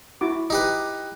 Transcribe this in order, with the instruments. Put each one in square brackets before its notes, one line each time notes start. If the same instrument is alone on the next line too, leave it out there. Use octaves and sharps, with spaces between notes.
[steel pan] E4 F#4 D6
[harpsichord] D#4 G4 B4